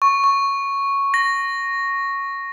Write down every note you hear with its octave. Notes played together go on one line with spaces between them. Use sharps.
C#6
C#6
A#6